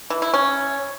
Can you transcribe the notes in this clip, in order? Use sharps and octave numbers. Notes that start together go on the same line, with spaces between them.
E3
E4
C#4